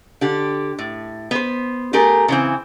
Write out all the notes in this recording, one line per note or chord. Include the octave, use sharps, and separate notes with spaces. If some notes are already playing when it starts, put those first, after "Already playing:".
D3 G4
A2
B3 C5
A3 G4 G#4 A#4
C#3 E3 C4